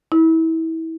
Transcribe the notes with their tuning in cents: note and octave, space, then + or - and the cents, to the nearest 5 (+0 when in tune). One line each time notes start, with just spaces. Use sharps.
E4 -30